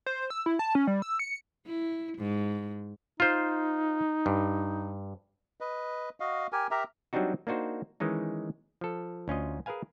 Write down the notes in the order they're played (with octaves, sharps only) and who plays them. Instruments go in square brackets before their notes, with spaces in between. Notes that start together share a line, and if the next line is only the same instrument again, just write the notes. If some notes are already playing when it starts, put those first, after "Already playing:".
[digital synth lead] C5
E6
E4
A5
C#4
G3
E6
C#7
[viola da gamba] E4
G#2
[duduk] D#4 [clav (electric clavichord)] F4 C5
[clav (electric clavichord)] G2
[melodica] B4 D#5
F#4 D#5 F5
G4 A#4 G#5
G4 A#4 E5 A#5
[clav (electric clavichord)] F#3 G3 C4 D4 D#4 F#4
A#3 D4 D#4 F#4 C5
D#3 E3 G#3 C#4 D#4
F3 A4
D2 C#4 F4 D#5
G#4 A#4 B4 F5 G#5